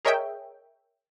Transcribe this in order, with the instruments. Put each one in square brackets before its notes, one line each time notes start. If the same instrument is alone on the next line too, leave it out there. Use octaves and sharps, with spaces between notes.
[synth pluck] G#4 A#4 C#5 D#5 E5 G5